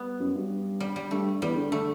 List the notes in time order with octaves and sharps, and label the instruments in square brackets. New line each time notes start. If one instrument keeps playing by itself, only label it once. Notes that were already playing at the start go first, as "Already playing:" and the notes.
Already playing: [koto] G3 B3
[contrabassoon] F#2
G2
[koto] G3
G3
[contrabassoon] G2 [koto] A3
[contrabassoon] E2 [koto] G3
[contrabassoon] D3
[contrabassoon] D3 [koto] A3